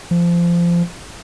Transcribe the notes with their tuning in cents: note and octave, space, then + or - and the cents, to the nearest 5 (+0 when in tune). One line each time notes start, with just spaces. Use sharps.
F3 -20